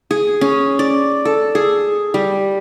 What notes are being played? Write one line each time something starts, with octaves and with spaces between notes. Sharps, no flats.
G#4
C#4
D5
A4
G#4
G3